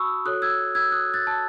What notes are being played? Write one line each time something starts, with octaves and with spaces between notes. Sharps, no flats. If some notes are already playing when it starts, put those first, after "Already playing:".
Already playing: F#4 A5 B5 C#6 D#6 E6
F#4 A4 C#5 D#6 F#6
E6 G#6
E6 G#6
D#6 F#6
F#6 A6
A5